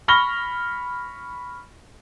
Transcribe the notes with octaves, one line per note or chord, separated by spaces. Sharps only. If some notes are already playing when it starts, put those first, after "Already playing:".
B5 C#6 F6 A#6 G7